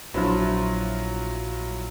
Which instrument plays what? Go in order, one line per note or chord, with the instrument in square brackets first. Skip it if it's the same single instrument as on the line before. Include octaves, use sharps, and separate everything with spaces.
[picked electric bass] A#1 [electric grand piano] F#3 [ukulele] D4 C5 E5 [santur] E4 F4